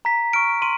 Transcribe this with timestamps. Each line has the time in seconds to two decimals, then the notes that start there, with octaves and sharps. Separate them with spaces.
0.05 A#5 B6
0.33 C#6 F6 D7
0.62 C6 D#7